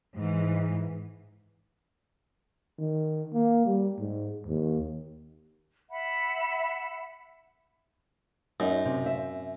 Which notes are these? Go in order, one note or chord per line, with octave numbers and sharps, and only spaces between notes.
G#2 E3
D#3
A#3
G3
G#2
D#2
E5 F#5 B5
F#2 D#4
C3
E5